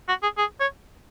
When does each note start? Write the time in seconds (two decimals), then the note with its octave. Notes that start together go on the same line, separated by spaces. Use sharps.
0.09 F#4
0.23 G#4
0.38 G#4
0.60 C#5